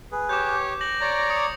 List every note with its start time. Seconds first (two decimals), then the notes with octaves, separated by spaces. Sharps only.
0.12 G#4 B4
0.29 G4 C#5 D6 G6
0.81 D6 A#6 F#7
1.01 C#5 D5 A#5
1.30 D#6 C#7